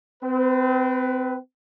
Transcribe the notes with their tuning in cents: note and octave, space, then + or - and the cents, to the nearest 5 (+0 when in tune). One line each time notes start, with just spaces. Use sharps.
C4 -30 B4 +10